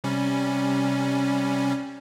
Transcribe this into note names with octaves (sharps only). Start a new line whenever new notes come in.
C3 G3 C#4